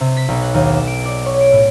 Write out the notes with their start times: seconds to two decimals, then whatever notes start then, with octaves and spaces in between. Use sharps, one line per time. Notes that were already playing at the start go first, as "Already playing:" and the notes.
0.01 C3
0.17 B6
0.28 B1
0.43 F#5
0.54 D#2
0.69 E7
0.87 D7
1.05 D5
1.26 C#5
1.41 D7
1.52 A2